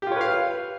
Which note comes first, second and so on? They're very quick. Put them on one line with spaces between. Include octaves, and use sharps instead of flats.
G4 F4 C#5 B4 F5